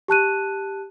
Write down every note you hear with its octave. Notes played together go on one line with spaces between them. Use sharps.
G4 A5 F#6 D#7